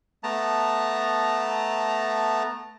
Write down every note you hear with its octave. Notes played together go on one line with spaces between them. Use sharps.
A3 B3 A5 A#5